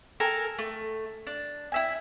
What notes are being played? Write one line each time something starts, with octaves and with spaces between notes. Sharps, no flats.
A4 A#4 G#5
A3
D4
E4 E5 G#5